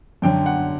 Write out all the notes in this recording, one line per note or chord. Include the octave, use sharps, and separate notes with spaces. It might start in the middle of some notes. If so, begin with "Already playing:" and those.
F#2 D3 F#3 G5
F#5